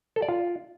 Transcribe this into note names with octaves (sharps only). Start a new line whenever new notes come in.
A4
D5
F4